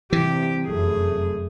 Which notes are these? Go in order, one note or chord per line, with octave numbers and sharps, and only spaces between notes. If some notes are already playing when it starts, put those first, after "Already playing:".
G2 C3 E3 G4
F1 F#2 A3 G#4